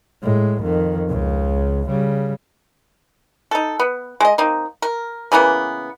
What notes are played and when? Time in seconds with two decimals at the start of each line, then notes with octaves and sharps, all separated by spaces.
0.23 A2 G#3
0.63 F2 D#3
1.09 C#2 C#3
1.87 C#3 G3
3.51 D#4 A4
3.79 B3
4.20 G#3 D#5
4.38 A#3 C4 D#4
4.82 A#4
5.32 C#3 E3 A#3 B3